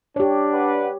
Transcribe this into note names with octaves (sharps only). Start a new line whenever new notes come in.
D4 G4 C#5
B4 D5 F#5